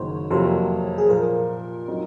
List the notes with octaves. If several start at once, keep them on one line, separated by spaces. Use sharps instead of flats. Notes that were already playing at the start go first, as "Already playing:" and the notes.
Already playing: F#1 D#3 F#3 C5 C#5
F2 C3 F#3 A#3 C5
G#4
A#2 F3 A#3 A#4
F#3 C4 D#4